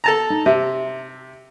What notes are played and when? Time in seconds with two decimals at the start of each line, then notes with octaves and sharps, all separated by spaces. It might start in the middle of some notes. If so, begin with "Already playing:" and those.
0.04 A4 A5 A#5
0.30 D#4
0.46 C3 E5